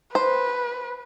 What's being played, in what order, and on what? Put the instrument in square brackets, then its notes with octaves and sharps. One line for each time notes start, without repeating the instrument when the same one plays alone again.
[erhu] B4 [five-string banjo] C5